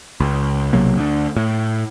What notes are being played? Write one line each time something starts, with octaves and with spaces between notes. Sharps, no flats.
C#2
B1 C3 F#3 A#3
D2 D3
A2